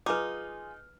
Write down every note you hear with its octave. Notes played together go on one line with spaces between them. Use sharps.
D#4 F4 G#4 B4 D6 F6